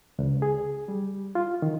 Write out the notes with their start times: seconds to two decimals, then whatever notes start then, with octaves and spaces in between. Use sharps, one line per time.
0.19 C#2
0.42 G#4
0.88 G3
1.35 F4
1.62 D#3